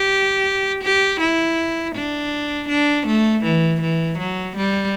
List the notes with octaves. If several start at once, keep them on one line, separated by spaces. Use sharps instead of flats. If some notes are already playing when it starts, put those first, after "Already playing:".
Already playing: G4
G4
E4
D4
D4
A3
E3
E3
F#3
G3